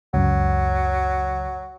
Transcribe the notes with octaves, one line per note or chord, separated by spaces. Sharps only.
C#2 F#2 F#3